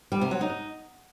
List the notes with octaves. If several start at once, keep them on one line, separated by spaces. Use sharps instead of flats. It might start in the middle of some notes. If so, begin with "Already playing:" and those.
G3
C3
F#3
D#4